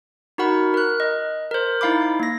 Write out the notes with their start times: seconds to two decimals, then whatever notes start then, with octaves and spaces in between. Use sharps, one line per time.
0.38 D#4 F#4 A#4 F#5 B5
0.74 A#4 F#6
1.00 D#5
1.51 A#4 C5
1.81 D#4 E4 F5 B5 D6
2.20 A#3 A#6